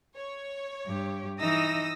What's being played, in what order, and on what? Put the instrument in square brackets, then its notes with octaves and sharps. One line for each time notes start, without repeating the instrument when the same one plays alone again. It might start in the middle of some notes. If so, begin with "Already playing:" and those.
[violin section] C#5
[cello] G2 G4
[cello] E3 D#4 [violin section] D#6 E6 A#6